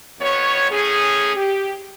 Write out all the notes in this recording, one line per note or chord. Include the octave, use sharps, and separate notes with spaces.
F2 B3 C#5
A2 C#4 G#4
G4